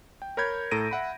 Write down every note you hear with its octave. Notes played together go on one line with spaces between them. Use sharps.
G5
A#4 C#5 B5 G6 G#6
A2 A4 A#5 A#6 D7 D#7
E5 F#5 B5